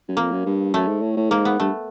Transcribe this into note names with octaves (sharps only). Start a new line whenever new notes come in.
F#2
F2 A#3
F#2
G2
F#2 A3
G#2
A2
A2
G#2 A#3
B3
G2 A3